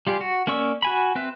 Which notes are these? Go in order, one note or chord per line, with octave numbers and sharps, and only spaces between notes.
G3 F4 G4 G#4
F#4
A#3 C#4 D5 C#6 E6
F#4 G#5 B5
C4 B4 E5